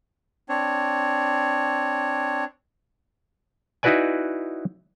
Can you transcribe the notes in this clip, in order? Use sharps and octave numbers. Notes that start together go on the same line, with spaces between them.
C4 D4 C#5
D#4 E4 F#4 B4 D5 G#5